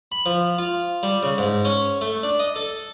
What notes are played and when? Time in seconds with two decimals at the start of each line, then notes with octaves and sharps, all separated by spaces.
0.12 B5
0.26 F3
0.58 F4
1.03 G3
1.23 C#3
1.38 G#2
1.65 C#4
2.01 A3
2.23 D4
2.39 D#5
2.56 A4